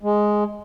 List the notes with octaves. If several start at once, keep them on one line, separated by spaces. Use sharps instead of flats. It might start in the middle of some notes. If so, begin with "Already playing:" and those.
G#3